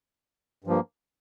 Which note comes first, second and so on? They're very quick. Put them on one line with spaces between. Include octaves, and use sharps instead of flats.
G2 F3 A#3